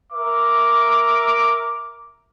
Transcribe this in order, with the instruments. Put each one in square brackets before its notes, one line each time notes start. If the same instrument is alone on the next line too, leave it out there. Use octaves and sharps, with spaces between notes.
[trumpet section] A#4 E5 D6